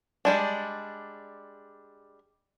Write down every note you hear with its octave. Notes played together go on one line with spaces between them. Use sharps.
G3 G#3 D4